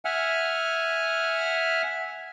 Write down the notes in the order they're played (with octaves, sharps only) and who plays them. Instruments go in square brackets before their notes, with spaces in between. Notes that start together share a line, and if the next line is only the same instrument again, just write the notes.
[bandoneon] E5 F#5 G#5 F6